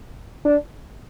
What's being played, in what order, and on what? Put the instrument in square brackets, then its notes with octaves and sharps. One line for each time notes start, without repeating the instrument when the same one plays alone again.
[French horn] D4